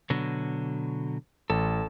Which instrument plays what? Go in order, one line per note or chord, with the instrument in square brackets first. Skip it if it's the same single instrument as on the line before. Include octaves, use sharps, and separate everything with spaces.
[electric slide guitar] B2 D3 F#3
[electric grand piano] A1 [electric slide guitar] A4